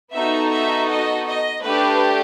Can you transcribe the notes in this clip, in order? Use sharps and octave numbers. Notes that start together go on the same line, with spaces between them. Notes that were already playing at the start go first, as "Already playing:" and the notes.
B3 D#4 F#4 A4 E5
E5
D#5
D#5
A3 D4 G4 B4